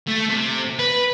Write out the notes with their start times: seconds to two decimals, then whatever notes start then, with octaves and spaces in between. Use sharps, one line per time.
0.07 A3
0.29 C3
0.79 B4